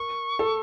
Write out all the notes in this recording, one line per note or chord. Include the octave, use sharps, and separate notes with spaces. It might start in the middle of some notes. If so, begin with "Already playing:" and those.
Already playing: A#4 C#6
A4